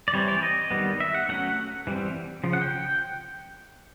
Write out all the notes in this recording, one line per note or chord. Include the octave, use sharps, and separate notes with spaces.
D5
E3 G3 C4 C#5
D5
D#5
D#3 G3 B3
E5
F#5
F#3 A3 C#4 F#5
E3 G3 C4
C#3 F3
F#5
G5